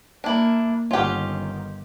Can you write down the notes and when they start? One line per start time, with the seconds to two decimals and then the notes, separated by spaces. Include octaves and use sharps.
0.24 A#3 D4 E4
0.91 G1 D#3 C#4 F4 G4 F#5